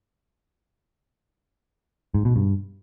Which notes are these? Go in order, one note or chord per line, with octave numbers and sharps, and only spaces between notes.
G#2
B2
G2